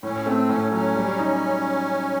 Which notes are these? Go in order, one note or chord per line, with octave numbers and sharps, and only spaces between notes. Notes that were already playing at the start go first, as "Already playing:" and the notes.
A2 C#4
A3 C4
A2 C#4
F#3 C#4
G3
D#4